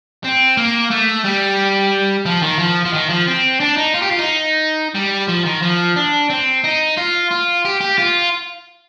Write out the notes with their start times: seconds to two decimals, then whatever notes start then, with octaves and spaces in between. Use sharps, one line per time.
0.24 C4
0.57 A#3
0.91 A3
1.25 G3
2.26 F3
2.42 D#3
2.59 F3
2.85 F3
2.93 D#3
3.09 F3
3.27 C4
3.60 D4
3.77 D#4
3.94 F4
4.02 G4
4.11 F4
4.19 D#4
4.95 G3
5.28 F3
5.46 D#3
5.62 F3
5.96 D4
6.30 C4
6.64 D#4
6.97 F4
7.31 F4
7.65 G4
7.81 G4
7.98 F4